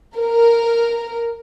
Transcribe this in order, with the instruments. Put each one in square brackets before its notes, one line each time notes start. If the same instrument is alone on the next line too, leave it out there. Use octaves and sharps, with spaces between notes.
[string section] A#4